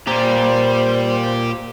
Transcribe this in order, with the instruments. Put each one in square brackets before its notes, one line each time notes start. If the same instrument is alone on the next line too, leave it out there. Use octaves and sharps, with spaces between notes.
[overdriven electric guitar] A#2 A#5 [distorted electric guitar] G4 D5 [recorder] C5